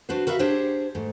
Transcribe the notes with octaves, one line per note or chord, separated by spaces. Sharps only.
D4 F#4 B4 C5
F#4 A#4 B4 E5 F5
D4 G4 G#4 C5 C#5
G#2 A3